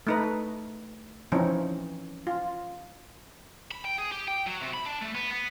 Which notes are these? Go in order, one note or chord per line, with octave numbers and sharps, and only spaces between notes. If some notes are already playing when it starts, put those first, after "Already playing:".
A3 D#4 B4
E3 F3 C4 C#4 D#4
F4
B5
G5
G#4
G4
G5
F#3
C3
B5
D4
A3
B3
B3